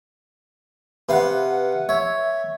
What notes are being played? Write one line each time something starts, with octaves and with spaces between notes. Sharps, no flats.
C3 B4 F5 F#5
C#5 E5